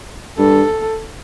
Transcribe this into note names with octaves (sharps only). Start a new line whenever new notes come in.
G2 A4